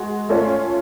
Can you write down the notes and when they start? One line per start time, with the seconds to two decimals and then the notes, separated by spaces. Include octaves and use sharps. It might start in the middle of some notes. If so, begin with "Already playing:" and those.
Already playing: G#3 F#4
0.29 A3 C#4 F4